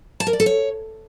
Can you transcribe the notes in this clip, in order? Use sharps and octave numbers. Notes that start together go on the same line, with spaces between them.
A5
A#4
D5
A4
C#5